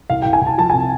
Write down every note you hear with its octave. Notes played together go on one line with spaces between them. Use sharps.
C2 F5
G5
C2
G#5
C2
A5
F3 A5
G#5
C3